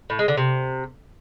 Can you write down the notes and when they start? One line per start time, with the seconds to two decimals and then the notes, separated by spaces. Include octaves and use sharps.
0.10 A2
0.19 G#3
0.28 D3
0.37 C3